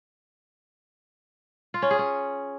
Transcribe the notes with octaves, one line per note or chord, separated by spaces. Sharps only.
F4
C#4
G#4
C#4